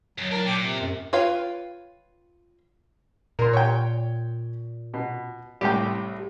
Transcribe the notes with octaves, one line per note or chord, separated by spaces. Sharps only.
F#2 D#3 F#3
A2 D4 A#4 A5
A#2 G5 D6
C3
F#2
F4 B4 C#5 F5 G5
A#2 A#4 C6
C#5 G5
B2
C2 A2 G4 G5